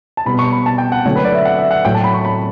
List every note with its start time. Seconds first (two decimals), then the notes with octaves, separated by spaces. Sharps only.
0.17 A5
0.26 B2 G3 B3 B5
0.39 C#6
0.52 B5
0.66 A5
0.78 G5
0.92 F#5
1.05 D3 F#3 A3 C#5
1.16 B4
1.24 D5
1.35 E5
1.45 F#5
1.58 E5
1.71 F#5
1.85 A2 F#3 A3 G5
1.94 A5
2.04 B5
2.14 C#6
2.25 B5